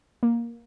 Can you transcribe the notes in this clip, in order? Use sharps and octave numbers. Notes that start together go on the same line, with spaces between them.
A#3